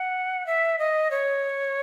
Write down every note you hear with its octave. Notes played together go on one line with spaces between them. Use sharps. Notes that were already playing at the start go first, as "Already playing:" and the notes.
Already playing: F#5
E5
D#5
C#5